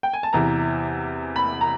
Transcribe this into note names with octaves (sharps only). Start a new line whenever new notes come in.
G5
G#5
A5
E2 C3 E3 A#5
B5
A#5